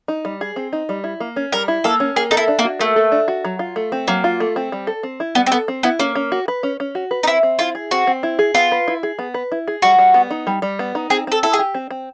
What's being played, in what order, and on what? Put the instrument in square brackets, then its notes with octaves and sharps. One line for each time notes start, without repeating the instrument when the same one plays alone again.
[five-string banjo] D#4
G3
G#4
C4
D#4
G3
E4
A#3
C#4
[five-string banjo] G3 [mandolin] A#4
[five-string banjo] E4
[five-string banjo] A#3 [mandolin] A4
[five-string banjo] C#4
[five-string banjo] A#3 [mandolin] G#4
[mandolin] D#4 [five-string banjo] A4
[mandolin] E4
[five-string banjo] D4
[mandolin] A#3
[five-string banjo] F#4
[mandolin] A3 [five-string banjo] A#3
[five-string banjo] A4
D4
F#4
F#3
F4
A3
C4
[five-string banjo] F#3 [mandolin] A#3
[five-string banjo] F4
A3
C4
G3
A4
C4
E4
[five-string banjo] G3 [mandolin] B3
[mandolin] C4
[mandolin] B3 [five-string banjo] A4
[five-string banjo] C4
[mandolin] B3 [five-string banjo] E4
[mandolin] A#3 [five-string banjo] C#4
[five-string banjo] C#4
F#4
B4
C#4
C#4
F#4
B4
[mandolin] D#4
[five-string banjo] C4 [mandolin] E4
[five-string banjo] C4
[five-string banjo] E4 [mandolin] F4
[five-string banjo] G#4
[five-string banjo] C4 [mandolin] F#4
[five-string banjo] C4
E4
G#4
[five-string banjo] B3 [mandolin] F4
[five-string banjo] B4
E4
G#4
B3
B4
E4
G#4
[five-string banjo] G3 [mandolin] F#4
[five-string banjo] G3
B3
D#4
G3
G3
B3
D#4
[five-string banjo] C4 [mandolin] G#4
[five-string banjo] C4 [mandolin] A4
[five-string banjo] E4 [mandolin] A4
[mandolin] G#4
[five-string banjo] G4
C4
C4